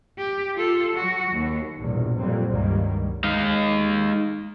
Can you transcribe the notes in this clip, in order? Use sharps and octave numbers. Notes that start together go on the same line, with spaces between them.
G4
F4 A4
F#3 F#4
D#2
A#1 E2 G2 B2
F2 A#2 F#3 G3 C4
C#2 G2 D#3 F#3 G3 A#3
G#3 D#4 F5